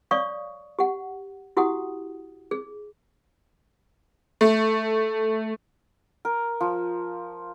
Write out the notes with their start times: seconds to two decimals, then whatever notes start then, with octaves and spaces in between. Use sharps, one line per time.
0.11 C#5 D5 F5 C#6 D#6
0.79 G4 F#5
1.57 E4 F#4 G4 F#5 D#6
2.51 G#4
4.41 A3
6.25 A#4
6.60 F3